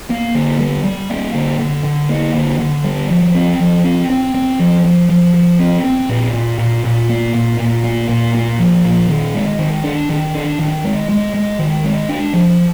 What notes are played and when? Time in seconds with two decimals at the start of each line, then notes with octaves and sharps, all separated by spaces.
0.10 A#3
0.35 D3
0.59 G3
0.84 G3
1.10 A#3
1.35 D3
1.59 D3
1.84 D3
2.09 A#3
2.34 D3
2.59 D3
2.84 G3
3.10 F3
3.34 C4
3.60 F3
3.84 C4
4.10 C4
4.34 C4
4.59 F3
4.85 F3
5.10 F3
5.34 F3
5.59 C4
5.84 C4
6.09 A#2
6.34 A#2
6.59 A#2
6.84 A#2
7.09 A#3
7.35 A#2
7.59 A#2
7.84 A#3
8.09 A#2
8.34 A#3
8.59 F3
8.84 A#2
9.09 D#3
9.35 G#3
9.59 D#3
9.84 D4
10.09 D#3
10.35 D4
10.59 D#3
10.84 G#3
11.09 G#3
11.34 G#3
11.59 D#3
11.84 G#3
12.09 D4
12.33 F3